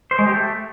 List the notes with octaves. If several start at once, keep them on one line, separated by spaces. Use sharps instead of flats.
C5
G#3
G4
A3